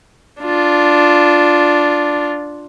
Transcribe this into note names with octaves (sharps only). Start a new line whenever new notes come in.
D4 F4